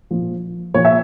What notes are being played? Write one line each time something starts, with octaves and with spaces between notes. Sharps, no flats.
A#2 F3
A#2 F3 C#5
E5